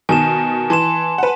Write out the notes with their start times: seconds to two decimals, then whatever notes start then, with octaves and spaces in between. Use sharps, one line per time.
0.09 B2 D#3 G#5 A5 E7
0.70 E3 A5 C6 E7
1.18 B4 F#5